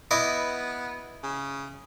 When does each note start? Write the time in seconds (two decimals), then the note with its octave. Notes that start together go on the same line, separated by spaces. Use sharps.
0.11 B3 E4 D#5 D6
1.23 C#3